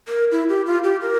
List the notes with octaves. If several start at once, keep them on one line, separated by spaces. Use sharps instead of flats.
A#4
E4
G4
F4
G4
A#4